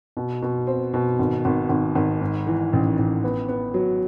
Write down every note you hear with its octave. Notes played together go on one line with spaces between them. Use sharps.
B2
B2
C4
B2
G#1
G#1
G#1
G#1
G#2
E3
A1
A1
B3
B3
F#3